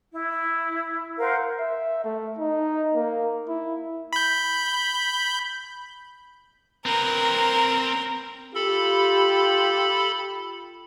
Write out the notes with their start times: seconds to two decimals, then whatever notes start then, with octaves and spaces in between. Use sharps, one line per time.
0.12 E4
1.18 A#4 C5 F5 F#5
1.59 E5
2.05 A3
2.39 D#4
2.95 A#3
3.48 E4
4.13 B5 G6
6.86 C4 A#4 B4
8.55 F4 G4 A4 B5